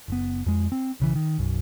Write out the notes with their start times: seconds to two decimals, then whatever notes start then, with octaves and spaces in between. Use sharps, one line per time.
0.08 F#1 B3
0.46 F2 G#3
0.72 C4
1.00 B1 C#3 E3
1.15 D#3
1.38 B1 F#2